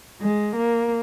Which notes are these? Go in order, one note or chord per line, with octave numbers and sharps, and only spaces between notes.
G#3
A#3